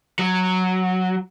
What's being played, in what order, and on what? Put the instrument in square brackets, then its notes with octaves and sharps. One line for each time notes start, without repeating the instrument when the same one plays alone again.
[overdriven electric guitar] F#3